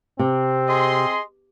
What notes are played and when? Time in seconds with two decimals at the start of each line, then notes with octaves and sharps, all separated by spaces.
0.19 C3 C4
0.68 G#4 D#5 C6